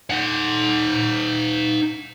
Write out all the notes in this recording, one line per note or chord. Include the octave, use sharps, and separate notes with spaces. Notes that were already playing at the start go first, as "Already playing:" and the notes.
D#4 F#5